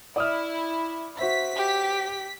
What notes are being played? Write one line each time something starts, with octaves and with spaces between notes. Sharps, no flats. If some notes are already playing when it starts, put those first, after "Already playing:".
E4 D5 D#6 F6
F#4 C5 E5 B6
G4